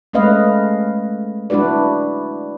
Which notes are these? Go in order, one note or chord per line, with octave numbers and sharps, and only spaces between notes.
G#3 A3 C#4 B4 D#5 F5
D4 E4 F#4 B4 D5